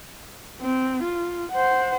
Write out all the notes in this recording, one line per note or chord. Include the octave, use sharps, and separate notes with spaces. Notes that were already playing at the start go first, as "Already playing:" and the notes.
C4
F4
C5 F#5